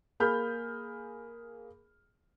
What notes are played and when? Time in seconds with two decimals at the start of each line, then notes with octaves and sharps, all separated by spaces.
0.20 A#3 G#4 B5 F6 G6